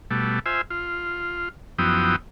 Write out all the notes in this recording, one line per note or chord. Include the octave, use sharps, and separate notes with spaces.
B2 G3 A3
F4 C5 E5 G#5
F4
F#2 F3 B3 E4 G5 D#6